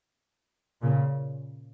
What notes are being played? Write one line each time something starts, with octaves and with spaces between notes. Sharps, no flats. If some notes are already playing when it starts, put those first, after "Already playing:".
A#2 C#3